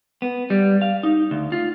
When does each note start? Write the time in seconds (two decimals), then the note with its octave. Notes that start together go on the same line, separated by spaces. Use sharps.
0.22 B3
0.50 G3
0.82 F5
1.03 D#4
1.31 D2
1.52 F4